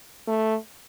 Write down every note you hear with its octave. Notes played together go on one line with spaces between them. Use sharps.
A3